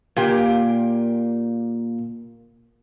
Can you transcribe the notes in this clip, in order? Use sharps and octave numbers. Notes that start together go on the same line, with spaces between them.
A#2 A#3 G4